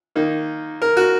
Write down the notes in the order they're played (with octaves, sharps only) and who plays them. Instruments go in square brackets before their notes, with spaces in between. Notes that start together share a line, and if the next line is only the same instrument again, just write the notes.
[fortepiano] D#3 A#3 D#4
A#4
F#4